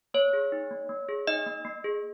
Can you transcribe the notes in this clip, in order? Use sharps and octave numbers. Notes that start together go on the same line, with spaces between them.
A#3 C#5
G#4
D#4
A#3
A#3
G#4
D#4 D#5
A#3
A#3
G#4